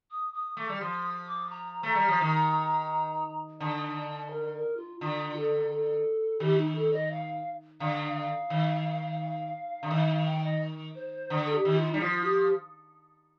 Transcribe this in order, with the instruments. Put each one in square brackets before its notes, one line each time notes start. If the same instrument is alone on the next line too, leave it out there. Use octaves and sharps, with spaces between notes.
[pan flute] D#6
D#6
[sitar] A3 [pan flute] D6
[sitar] G3
[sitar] F3 [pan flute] C6
[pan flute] D6
A#5
[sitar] A3 [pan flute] A#5
[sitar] G3
F3
D#3
[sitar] D3 [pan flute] A5
[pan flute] A#4
A#4
F4
[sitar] D3 [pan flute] F4
[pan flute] A4
A4
[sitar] D#3 [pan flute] G4
[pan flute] D#4
A4
D#5
F5
[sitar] D3 [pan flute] F5
[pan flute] F5
[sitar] D#3
D3
[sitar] D#3 [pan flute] F5
[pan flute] F5
G5
D#5
C5
[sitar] D3
[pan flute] A4
G4
[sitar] D#3
[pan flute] F4
[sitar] G3 [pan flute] D#4
[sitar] F3 [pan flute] F4
[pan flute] G4